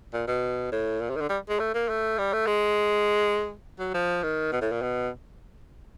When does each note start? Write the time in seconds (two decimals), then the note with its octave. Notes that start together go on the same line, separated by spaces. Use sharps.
0.13 A#2
0.27 B2
0.71 A2
1.01 A#2
1.10 C3
1.16 D#3
1.21 D3
1.29 G3
1.49 G#3
1.59 A3
1.74 A#3
1.89 A3
2.18 G3
2.33 A3
2.46 G#3
3.79 F#3
3.94 F3
4.23 D#3
4.52 B2
4.61 A2
4.72 A#2
4.82 B2